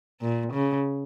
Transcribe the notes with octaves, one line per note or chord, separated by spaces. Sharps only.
A#2
C#3